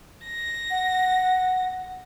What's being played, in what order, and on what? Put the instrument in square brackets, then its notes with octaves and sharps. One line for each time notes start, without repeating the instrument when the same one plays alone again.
[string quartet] A#6
[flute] F#5